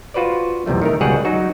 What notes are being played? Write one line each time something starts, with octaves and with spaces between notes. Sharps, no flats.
F4 F#4 B4 C5 D5
B1 E2 C3 G3 A3
D#3 A3 A#4
C#2 B2 G3 G#4 C#5 F#5
F#3 D#4 F#4